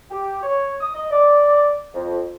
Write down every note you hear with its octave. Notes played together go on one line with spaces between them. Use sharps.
G4
C#5
D#6
D#5
D5
F2